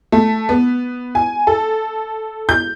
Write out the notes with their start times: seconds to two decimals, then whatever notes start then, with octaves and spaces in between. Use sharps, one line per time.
0.12 A3
0.49 B3
1.15 G#5
1.47 A4
2.49 G6